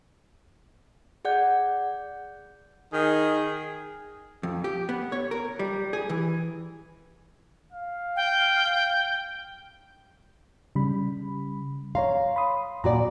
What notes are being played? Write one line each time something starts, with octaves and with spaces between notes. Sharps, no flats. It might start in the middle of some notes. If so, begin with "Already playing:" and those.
G#4 D5 F#5 G6
D#3 G#4
F2
G4
B3
C#5
A#4
G3
G#4
E3
F5
G5
C#3 G3 B5
C#5 F5 A#5 C6
B5 C6 D#6
A#2 F#4 D5 A#5